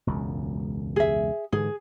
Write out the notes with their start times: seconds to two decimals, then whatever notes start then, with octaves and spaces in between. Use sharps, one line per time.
0.07 E1 C#2 F#2
0.96 G#4 E5
1.52 G#2 D3 E3 G#4